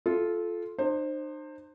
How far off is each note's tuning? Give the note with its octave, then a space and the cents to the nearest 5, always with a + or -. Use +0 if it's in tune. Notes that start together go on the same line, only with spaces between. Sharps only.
F4 +0 A4 -20
D#4 -45 C5 +15